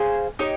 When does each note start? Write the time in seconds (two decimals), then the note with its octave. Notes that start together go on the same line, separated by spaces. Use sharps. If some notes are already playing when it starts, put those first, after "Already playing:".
Already playing: G#4 C5 F5 G#5
0.39 D#4 G4 C#5